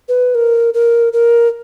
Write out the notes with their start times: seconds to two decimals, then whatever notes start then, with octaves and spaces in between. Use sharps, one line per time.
0.09 B4
0.35 A#4
0.74 A#4
1.13 A#4